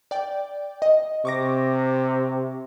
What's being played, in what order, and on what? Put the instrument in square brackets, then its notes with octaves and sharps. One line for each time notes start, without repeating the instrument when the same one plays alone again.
[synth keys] D5 G5
D#5
[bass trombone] C3 [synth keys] C#6 D6 A#6